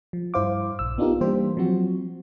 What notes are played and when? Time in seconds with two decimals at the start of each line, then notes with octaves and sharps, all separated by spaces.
0.13 F3
0.34 G2 E4 C5 F5 D6
0.79 A#1 E6
0.98 B3 D4 D#4 F4 G4 A#4
1.21 E3 G3 A#3 G4 C5
1.57 F3 F#3 C4 F#4